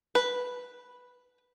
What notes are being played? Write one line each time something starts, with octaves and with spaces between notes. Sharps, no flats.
B4